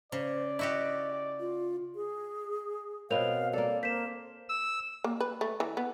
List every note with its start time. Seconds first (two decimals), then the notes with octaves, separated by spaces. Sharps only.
0.12 C#3 C5 D5
0.59 E4 F#4 G4 D#5
1.40 F4
1.95 G#4
3.10 B2 B3 C4 A#4 C#5 F5 F7
3.53 A#3 A4 D5
3.83 A#3 C5 B6 E7
4.49 E6
5.04 A#3
5.20 B4
5.41 A3
5.60 E3
5.77 B3